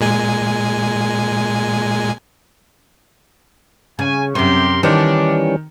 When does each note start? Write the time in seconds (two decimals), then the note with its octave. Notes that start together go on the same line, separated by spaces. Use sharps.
0.01 A#2 G#3 G#5
3.99 C#3 G#5
4.35 F#2 C3 G4 A#4 C6
4.83 D#3 E3 G3 C#4 D4 C5